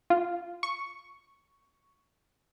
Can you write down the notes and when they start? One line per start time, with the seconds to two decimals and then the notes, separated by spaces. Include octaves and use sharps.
0.10 F4
0.63 C#6